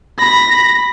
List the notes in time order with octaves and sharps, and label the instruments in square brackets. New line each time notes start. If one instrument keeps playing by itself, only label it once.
[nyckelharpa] B5 [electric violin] A#6